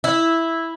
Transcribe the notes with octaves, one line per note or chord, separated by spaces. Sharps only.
E4